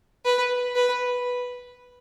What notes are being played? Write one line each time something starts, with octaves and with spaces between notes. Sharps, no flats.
B4
B4